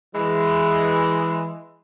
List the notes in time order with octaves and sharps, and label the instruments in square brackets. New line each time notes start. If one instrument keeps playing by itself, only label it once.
[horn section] E3 G#3